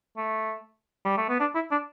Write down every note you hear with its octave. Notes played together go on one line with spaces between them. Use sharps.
A3
G3
A3
B3
D4
E4
D4